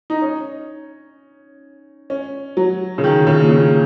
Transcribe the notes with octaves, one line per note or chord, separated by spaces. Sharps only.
D#4
C#4
C#4
F#3
C#3
D#3
C#3
A#2
C#3